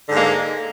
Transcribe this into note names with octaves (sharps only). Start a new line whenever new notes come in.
G#2 D3 G#3 A#3